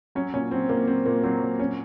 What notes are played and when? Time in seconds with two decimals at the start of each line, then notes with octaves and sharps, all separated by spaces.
0.15 F#3 C#4
0.33 A#2 C#4
0.51 F#3 C4
0.69 A#2 A#3
0.88 F#3 C4
1.05 A#2 A#3
1.23 F#3 C4
1.42 A#2
1.59 F#3 C#4